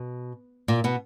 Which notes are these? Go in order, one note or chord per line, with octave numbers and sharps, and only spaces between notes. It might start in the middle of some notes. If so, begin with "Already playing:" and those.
Already playing: B2
A#2 A#3
B2 B3